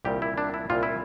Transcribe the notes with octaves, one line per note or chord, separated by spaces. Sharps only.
C2 A#2 G3 G4
E4
D4
E4
C2 A#2 G3 F4
E4